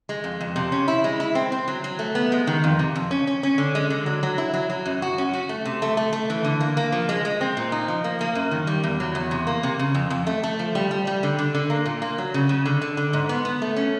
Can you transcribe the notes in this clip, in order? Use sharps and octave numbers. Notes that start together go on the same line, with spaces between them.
G#3
F2
F2
C3
C#4
E4
G#3
E4
C4
C4
F#3
F#3
A3
B3
G#3
D#3
F2
C3
F2
C#4
C#4
C#4
D3
G#3
D3
F#3
F#3
E4
F#3
F#3
F#2
F#4
C#4
F#4
A3
C3
A3
A3
A3
E3
D3
A#3
A#3
F3
G#3
G#3
C4
A#2
D#4
F3
A#3
A#3
F#2
D#3
G3
E2
F#3
E2
C3
A#3
C3
C#3
F2
F2
A3
A3
F3
G3
G3
G3
D3
D3
D3
A#3
A#2
A#3
F#3
C#3
C#3
D3
D3
D3
G#2
B3
B3
A3
C#4